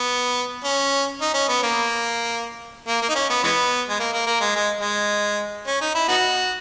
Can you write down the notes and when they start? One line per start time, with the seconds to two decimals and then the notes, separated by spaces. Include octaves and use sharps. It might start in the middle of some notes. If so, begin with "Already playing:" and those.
Already playing: B3
0.64 C#4
1.21 D#4
1.34 C#4
1.49 B3
1.63 A#3
2.88 A#3
3.02 A#3
3.09 D#4
3.15 C#4
3.30 B3
3.43 E3 G#3 B3
3.89 G#3
4.00 A#3
4.13 A#3
4.27 A#3
4.41 G#3
4.56 G#3
4.81 G#3
5.67 C#4
5.81 D#4
5.95 E4
6.08 B3 D#4 F#4